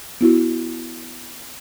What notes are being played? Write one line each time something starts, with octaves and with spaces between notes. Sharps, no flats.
B3 E4 F#4